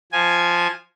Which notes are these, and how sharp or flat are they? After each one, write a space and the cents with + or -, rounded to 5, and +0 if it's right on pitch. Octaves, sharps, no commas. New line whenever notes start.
F3 -5 G#5 +0